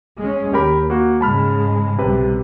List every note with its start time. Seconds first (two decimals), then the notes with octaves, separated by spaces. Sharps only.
0.18 G#3 C#4
0.53 D#2 G4 A#4 B5
0.90 A#3 F#4
1.21 G#2 C#3 G#3 A5 B5 F6
1.98 B1 C3 G3 B4